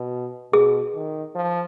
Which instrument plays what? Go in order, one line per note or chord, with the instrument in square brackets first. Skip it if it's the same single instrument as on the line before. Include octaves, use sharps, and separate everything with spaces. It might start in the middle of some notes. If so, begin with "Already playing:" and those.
Already playing: [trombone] B2
[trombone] B2 [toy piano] G#4
[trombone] D#3
F3